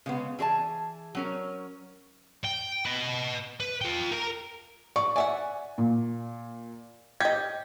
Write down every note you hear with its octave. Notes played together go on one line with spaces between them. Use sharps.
C#3 G#3 B3
E3 G#4 C5 A5
F#3 C#4 A#4
G5
B4 D#5
B4
F4 G5
A#4 A#5
D5 C#6
D5 E5 F#5 G#5
A#2
G4 D#5 G#6